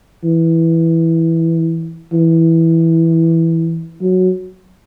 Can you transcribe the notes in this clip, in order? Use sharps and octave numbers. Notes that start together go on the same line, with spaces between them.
E3
E3
F#3